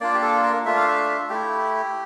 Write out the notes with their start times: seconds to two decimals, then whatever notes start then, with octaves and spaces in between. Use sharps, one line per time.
0.01 A#3 D4 F4 D5
0.14 G4
0.22 A4
0.43 A#4
0.65 A3 D4 F4 E5
0.77 F5
0.88 E5
1.29 A3 E4 G4